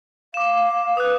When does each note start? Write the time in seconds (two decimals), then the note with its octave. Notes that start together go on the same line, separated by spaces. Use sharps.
0.34 F5 D6 E7
0.97 B4 D#6 F#6